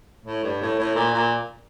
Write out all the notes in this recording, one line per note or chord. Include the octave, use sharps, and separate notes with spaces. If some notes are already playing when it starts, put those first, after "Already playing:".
A2
G2
A2
A2
A#2
A#2